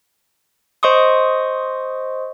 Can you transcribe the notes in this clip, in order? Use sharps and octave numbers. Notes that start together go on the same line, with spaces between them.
C5 D#5 C6 C#6 D#6